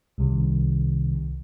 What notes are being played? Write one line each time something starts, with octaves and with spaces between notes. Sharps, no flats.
C2 C3 D#3